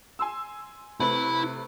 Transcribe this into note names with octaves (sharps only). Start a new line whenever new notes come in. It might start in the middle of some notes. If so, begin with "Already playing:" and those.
G#5 C6 E6
C3 A3 E4 B4 B5